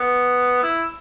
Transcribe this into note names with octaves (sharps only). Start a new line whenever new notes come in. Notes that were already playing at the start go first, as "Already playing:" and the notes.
Already playing: B3
E4